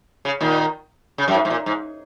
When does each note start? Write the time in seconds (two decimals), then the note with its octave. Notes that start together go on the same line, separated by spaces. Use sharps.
0.25 C#3
0.41 A#2 D#3
1.18 C#3
1.28 F#2
1.34 G#2
1.45 G#2
1.50 A#2
1.66 G#2